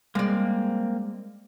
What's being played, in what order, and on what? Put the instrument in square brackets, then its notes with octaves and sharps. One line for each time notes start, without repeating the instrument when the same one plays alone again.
[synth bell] G3 [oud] G#3 D5 [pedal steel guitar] A#3 C4